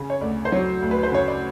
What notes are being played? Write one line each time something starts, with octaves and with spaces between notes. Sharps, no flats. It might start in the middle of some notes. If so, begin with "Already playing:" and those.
Already playing: C#3 G#4
C#5
D2 D5
C5
F#3 C#5
D2
B4
C5
C#3 C#5
D5